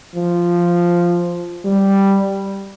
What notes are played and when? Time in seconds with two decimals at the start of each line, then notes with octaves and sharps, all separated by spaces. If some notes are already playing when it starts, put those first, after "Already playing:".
0.16 F3
1.65 G3